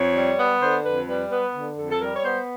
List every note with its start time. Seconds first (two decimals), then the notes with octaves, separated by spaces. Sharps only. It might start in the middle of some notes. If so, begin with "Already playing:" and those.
Already playing: F2 C#5
0.16 G3
0.38 B3
0.61 D3 C5
0.85 F2 B4
1.08 G3 B4
1.30 B3 B4
1.53 D3
1.76 F2 A4
1.91 A4
2.00 G3 A#4
2.16 C#5
2.23 B3 C5